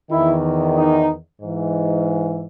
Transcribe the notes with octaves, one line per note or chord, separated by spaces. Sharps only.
E2 D#3 E4
D#4
G#2 E3